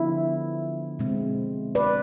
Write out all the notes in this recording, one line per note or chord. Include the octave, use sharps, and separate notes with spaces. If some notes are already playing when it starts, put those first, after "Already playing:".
Already playing: D3 F3 B3 E4
B2 G#3 C4
B4 D5